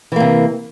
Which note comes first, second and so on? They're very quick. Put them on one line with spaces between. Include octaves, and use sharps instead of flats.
E3 A#3 C3